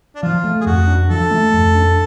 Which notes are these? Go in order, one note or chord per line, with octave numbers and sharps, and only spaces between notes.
D4
F3 F4
A3
G#4
F2 F#4
D4
F3 A4
A3
F2
D4